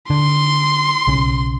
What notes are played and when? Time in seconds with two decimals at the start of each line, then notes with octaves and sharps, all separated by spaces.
0.10 D3 C6
1.07 B1 C#3